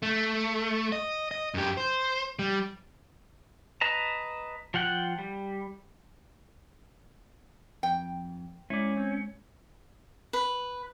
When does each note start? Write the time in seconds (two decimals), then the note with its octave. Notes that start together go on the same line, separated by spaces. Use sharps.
0.02 A3
0.92 D#5
1.31 D#5
1.54 F#2 G4
1.77 C5
2.39 G3
3.81 B4 D#5 A5 A#5
4.74 F3 F4 F#5 G5 F#6
5.19 G3
7.83 F2 G5
8.70 G#3 C#4 E4 D5
8.97 C4
10.33 B4